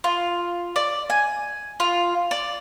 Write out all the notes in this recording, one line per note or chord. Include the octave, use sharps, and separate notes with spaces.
F4
D5
G#5
F4
D5